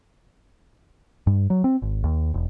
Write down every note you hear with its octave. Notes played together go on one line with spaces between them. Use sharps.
G2
F#3
C4
G#1
D#2
E1